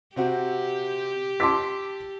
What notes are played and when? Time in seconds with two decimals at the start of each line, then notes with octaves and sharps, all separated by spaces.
0.16 C3 C4 F#4 G4
1.40 A5 C6 D6 E6 B6